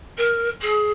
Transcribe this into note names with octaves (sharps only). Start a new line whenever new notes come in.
A#4
G#4